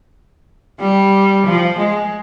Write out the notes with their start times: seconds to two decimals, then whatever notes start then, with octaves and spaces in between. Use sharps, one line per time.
0.80 G3
1.46 F3
1.78 G#3